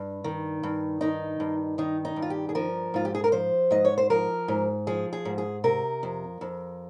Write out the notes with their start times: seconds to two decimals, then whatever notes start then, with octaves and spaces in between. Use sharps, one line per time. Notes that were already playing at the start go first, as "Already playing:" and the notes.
Already playing: G2
0.24 D#3
0.63 G2
1.01 D#3 D#4
1.40 G2
1.78 D#3 D#4
2.05 D#4
2.16 G2
2.22 F4
2.30 G4
2.49 G#4
2.55 F3 A#4
2.94 G#2 F4
3.05 G4
3.15 G#4
3.24 A#4
3.32 F3 C5
3.71 G#2 D#5
3.85 C#5
3.98 C5
4.10 F3 A#4
4.48 G#2
4.87 F3 G#4
5.13 G#4
5.25 G#2
5.38 G#4
5.64 C3 A#4
6.03 F2
6.41 F2